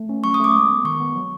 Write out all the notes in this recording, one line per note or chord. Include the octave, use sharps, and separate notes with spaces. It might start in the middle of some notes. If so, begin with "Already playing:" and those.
Already playing: A3
C#4
F#3 C#6
D#6
A3 D6
G#3
B3
D#3 C#6
B3
F#3